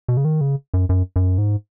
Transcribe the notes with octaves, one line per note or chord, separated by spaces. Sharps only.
B2
C#3
D#3
C#3
F#2
F#2
F#2
G#2